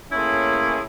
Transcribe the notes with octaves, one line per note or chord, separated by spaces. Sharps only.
A2 A#3 C#4 E4 G#4 C6